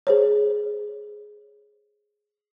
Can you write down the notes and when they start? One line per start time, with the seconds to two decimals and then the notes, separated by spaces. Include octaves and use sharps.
0.07 G#4 C5 C#5